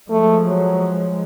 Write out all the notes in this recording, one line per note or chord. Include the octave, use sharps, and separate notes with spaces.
F3 G#3 A3
F#3